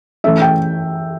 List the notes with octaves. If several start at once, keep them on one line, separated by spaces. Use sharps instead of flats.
E3 A3 C#4 E5
G5